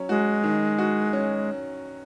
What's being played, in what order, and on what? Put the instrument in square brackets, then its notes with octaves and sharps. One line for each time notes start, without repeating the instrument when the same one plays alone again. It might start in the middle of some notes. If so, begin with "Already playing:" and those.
Already playing: [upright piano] F#3 C#4
[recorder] G#3 [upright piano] F#4
[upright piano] D#3
F#4
C#4